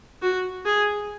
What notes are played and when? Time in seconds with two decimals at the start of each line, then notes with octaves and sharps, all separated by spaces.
0.22 F#4
0.65 G#4